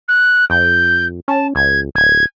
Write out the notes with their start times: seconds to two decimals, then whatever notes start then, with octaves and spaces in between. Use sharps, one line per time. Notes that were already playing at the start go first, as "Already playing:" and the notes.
0.08 F#6
0.50 F2 G6
1.28 C#4 A5
1.55 C#2 G#6
1.95 D1 G#6